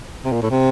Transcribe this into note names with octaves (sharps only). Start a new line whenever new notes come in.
C3
A#2
A2
C3